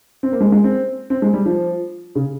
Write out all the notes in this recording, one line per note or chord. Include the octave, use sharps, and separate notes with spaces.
C4
A#3
G#3
G#3
C4
C4
G#3
G3
F3
C#3